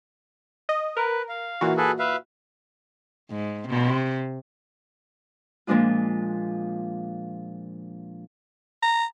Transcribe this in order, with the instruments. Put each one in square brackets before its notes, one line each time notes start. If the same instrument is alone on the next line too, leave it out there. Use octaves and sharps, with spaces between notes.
[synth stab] D#5
[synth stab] A#4 [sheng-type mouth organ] B4
[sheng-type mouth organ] F5
[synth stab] A#2 E3 F#4
[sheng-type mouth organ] G#4 A4 B4
B4 E5 F5
[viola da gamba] G#2
C3
[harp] A#2 F3 G#3 D4 F4
[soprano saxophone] A#5